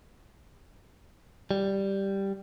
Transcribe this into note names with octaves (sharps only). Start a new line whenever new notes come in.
G3